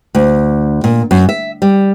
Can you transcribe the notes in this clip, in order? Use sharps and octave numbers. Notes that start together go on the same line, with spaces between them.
D2
A#2
F#2
E5
G3